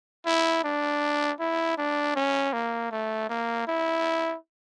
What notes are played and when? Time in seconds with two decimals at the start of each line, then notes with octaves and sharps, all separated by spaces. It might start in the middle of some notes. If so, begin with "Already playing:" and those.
0.26 E4
0.64 D4
1.40 E4
1.78 D4
2.16 C#4
2.53 A#3
2.91 A3
3.29 A#3
3.67 E4